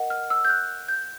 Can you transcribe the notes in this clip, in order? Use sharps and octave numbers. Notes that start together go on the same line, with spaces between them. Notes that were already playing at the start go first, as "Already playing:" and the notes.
Already playing: A#4 D#5 F#5
F6
E6
G6
F#6
G6